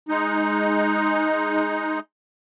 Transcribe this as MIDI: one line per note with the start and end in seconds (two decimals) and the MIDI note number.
0.09 2.00 56
0.09 2.00 63